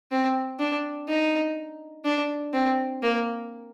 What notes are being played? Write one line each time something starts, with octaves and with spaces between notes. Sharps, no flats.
C4
D4
D#4
D4
C4
A#3